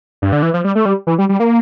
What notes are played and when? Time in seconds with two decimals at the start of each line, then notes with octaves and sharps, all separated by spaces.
0.22 G2
0.32 D3
0.43 E3
0.54 F3
0.64 G3
0.75 A3
0.85 G3
1.07 E3
1.18 G3
1.29 G3
1.40 A#3